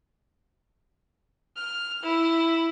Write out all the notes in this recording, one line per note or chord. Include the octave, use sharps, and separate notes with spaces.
F6
E4